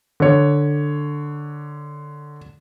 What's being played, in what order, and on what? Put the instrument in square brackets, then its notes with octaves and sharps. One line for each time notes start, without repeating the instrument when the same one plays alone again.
[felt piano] D3 C#5